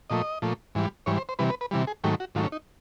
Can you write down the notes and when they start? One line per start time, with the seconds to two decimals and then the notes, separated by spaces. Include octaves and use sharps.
0.10 A#2 F3 A3 D#5
0.42 A#2 F3 A3
0.75 G#2 E3 G3
1.06 G#2 E3 G3 C#5
1.18 C5
1.29 C5
1.39 C3 E3 G3 B4
1.50 B4
1.61 B4
1.71 C3 E3 G3
1.87 G#4
2.04 G#2 D#3 F#3 A3 G4
2.20 F#4
2.35 G#2 D#3 F#3 A3 F4
2.43 C#4
2.52 D#4